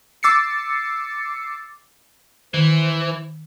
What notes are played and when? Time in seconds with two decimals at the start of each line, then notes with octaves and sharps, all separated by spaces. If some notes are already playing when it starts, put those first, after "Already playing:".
0.23 D6 E6 A6 C7 C#7
2.54 D#3 E3 C5